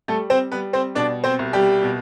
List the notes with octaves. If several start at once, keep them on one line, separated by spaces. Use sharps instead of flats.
G3 A3 A4
C4 C5
G3 B3 B4
C4 C5
B2 D4 D5
C4 C5
C2
G3 G4
B2